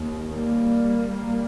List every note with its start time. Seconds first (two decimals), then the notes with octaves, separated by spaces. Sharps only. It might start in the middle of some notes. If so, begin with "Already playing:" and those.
Already playing: D#2
0.32 G3 A#3